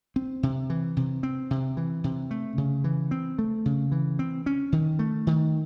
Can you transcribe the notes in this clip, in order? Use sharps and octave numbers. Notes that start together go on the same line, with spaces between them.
C4
C3
E3
C3
C4
C3
E3
C3
A3
C#3
E3
C4
A3
C#3
E3
C4
C#4
D#3
A3
D#3